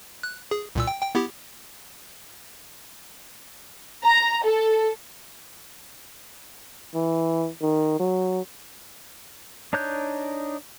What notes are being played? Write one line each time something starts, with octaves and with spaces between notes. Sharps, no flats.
F#6
G#4
C2 A#2 E6
G5
G5
B3 E4 G4
A#5
A4
E3
D#3
F#3
D4 D#4 C#5 F#6 G6